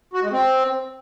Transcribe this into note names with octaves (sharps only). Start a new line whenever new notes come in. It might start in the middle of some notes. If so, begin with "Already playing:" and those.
F#4
G#3
C4